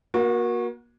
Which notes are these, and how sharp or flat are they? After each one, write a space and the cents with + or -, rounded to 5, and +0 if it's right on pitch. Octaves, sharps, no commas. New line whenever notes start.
A#3 +30 F#4 -20